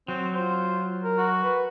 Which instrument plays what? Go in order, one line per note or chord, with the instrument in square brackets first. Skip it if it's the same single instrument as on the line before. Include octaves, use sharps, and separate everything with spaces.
[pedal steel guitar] F#3 [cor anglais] C4
[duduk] F4 [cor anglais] C5
[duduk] A#4
[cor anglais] F#4
[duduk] B4